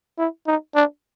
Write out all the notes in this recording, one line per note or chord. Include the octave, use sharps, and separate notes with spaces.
E4
D#4
D4